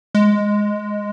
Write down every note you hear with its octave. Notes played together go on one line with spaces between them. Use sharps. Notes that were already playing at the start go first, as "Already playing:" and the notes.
G#3